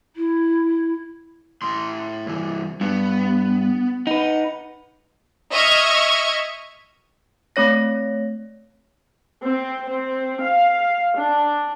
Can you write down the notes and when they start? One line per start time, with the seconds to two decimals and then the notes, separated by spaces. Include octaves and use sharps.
0.16 E4
1.62 A2 C6
2.26 G2 E3
2.81 G2 B3
4.07 D#4 B4 F#5
5.52 D#5 E5 C#6 F6 G#6
7.56 A3 C4 C#5 A#6
9.44 C4
9.89 C4
10.43 F5
11.17 D4